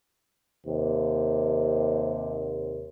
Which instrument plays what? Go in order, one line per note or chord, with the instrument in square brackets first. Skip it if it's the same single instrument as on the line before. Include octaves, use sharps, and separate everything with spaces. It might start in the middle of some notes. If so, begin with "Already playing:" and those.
[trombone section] D#2 C3